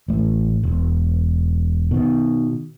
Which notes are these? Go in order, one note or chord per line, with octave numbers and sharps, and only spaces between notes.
A1 A2
E1
B2 D#3